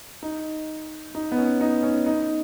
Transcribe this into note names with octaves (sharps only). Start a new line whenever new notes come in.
D#4
D#4
B3
C#4
D#4
C#4
D#4